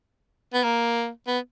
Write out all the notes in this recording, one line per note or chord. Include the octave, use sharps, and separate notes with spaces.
B3
A#3
B3